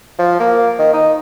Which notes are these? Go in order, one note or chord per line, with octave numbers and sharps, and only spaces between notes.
F3
A#3
D#3
D#4